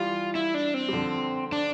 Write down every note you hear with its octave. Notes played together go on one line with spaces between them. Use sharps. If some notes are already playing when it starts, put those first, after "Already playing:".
Already playing: E3 G3 F4
E4
D4
C4
G3
D3 F3
D4